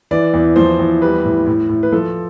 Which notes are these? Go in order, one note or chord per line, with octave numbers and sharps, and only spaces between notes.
E3 D5
E2
F3 C5
E2
G3 B4
A2
A2
A2
B4
F3 A4